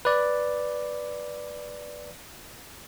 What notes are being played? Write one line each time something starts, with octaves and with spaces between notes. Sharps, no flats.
B4 D5